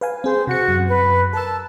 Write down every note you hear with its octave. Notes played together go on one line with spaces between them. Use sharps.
B4 F5 G#5
C4 G#4 C5
C3 F#4 C#7
F#2
B4
A#4 A5 E6